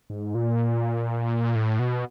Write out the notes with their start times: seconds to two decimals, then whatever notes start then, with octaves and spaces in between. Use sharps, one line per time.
0.10 G#2
0.35 A#2
1.55 A2
1.79 B2